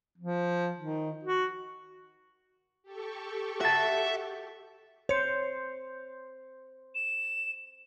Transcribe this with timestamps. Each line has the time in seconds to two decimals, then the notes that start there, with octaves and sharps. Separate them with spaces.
0.18 F3
0.78 D#3
1.23 F#4
2.83 G4 A4 C#6
3.61 F#4 E5 A5
5.09 C5 C#5 C#7
6.95 E7